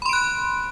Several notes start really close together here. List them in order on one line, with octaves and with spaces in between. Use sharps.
B5 C6 D7 F#6